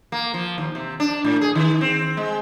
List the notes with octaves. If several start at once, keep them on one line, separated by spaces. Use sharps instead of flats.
A#3
F3
D#2
C3
D4
A2
G#4
D#3
C4
G#3